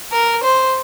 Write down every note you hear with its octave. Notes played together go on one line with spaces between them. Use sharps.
A#4
C5